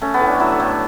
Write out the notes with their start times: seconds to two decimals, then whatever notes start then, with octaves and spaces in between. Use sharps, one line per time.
0.02 A3 C#4
0.14 B3
0.21 A2
0.27 D4
0.40 F#3 E4
0.60 A2